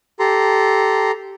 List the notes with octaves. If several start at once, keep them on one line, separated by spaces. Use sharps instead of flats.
G4 A4 A#5 C6